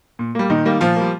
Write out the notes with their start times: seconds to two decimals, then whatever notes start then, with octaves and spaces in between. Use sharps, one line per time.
0.19 A#2
0.35 G3 A#3
0.50 A#2 D#3 D#4
0.65 G3 A#3
0.81 A#2 F3 F4
0.96 G3 A#3